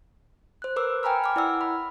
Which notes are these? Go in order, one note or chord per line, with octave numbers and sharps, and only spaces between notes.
C5 F#6
A#4 B4 D6 E6
G5 G#5 A#5 B5 F6
D6 F6
E4 D5 F#5 E6
B5